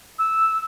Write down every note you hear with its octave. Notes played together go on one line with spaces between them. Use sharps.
E6